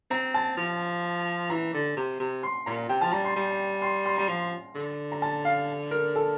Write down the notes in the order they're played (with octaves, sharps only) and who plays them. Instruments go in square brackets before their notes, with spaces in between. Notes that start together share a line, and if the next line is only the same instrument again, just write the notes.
[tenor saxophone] C4 [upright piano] A#5
[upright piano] A5
[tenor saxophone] F3
[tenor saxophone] E3 [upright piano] A#5
[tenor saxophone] D3
C3
C3
[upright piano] C6
[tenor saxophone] A#2 [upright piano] A#5
[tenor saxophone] C3 [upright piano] G5
[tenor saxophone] F3 [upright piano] A5
[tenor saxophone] G3 [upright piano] A#5
[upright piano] C6
[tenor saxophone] G3
[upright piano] C6
C6
[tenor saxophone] G3 [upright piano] A#5
[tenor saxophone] F3
D3
[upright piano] A#5
A5
F5
A#4
A4